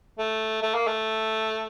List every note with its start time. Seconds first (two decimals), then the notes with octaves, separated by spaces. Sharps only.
0.19 A3
0.62 A3
0.75 A#3
0.87 A3